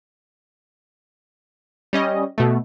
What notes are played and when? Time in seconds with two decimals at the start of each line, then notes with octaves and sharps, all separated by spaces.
1.93 G3 C#4 D#5
2.38 B2 A3